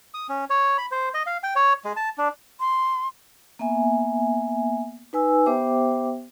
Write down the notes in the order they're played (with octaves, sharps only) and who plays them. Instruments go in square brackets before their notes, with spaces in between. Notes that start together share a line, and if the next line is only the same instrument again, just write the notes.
[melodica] D#6
C#4
C#5
B5
C5
D#5
F5
G5
C#5
G#3
A5
D4
[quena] C6
[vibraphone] A#3 B3 E5 G#5
D#4 B4 G#5 E6
B3 G4 C5 E5 G5 D6